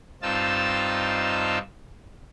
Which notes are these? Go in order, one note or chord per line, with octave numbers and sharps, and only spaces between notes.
G2 C4 D#4 F4 A5 E6